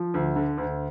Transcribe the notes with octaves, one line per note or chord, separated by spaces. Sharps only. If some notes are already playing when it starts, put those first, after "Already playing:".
Already playing: F3
D2
D3
D2